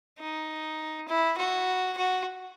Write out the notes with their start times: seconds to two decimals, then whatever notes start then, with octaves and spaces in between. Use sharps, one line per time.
0.19 D#4
1.08 E4
1.38 F#4
1.97 F#4